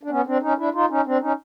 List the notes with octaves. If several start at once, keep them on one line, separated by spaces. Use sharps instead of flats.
D4
B3 C#4
C4 D4
C#4 D#4
D4 E4
D#4 F4
C#4 D#4
C4 D4
C#4 D#4